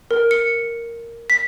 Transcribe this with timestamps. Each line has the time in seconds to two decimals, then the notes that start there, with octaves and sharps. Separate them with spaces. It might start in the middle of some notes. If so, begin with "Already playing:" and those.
0.11 A#4
0.31 C#7
1.30 B6